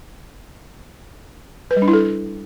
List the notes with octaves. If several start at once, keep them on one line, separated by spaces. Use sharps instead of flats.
B4
G3
D4
E4
A4